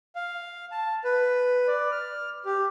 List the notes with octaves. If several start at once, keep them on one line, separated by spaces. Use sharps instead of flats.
F5
A5
B4
D5
F6
G4